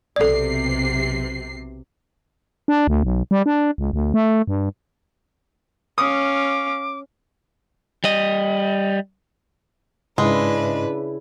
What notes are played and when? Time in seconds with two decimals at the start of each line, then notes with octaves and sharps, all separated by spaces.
0.16 B1 C3 A4 D5 C7
2.68 D4
2.87 D2
3.04 B1
3.31 G3
3.46 D4
3.78 C#2
3.93 D2
4.14 A3
4.48 G2
5.98 C#4 F5 D6 D#6
8.04 G3 D#5
10.18 G#2 C#3 G#3 D4 E4 B4